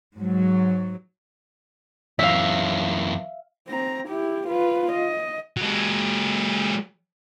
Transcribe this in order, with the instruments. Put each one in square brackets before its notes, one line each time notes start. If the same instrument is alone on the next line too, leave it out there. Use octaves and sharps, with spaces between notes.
[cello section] G#2 F#3
[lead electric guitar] F#2 E3 [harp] E5 F5
[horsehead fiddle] C4 A#5
E4 G4
F4 B4
D#5
[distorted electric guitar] F#3 G#3